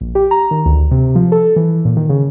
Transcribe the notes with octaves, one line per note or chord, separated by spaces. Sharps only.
A#1
G4
A#5
D#3
D2
C3
F3
A4
E3
A#2
D#3
C#3